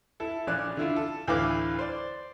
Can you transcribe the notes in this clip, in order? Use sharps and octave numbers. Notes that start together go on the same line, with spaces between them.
E4 A4
A#1 C#4 D5 F#6
D3 E4 F4
A4
D2 A2 E3 B4 F5 D6
C5 D5